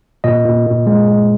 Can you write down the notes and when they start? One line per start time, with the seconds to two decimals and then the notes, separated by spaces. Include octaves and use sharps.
0.24 A#2 D#5
0.45 A#2
0.66 A#2
0.87 G#3
1.08 G#3